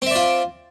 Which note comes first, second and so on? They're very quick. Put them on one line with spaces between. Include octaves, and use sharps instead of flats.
C4 E5 D5 F4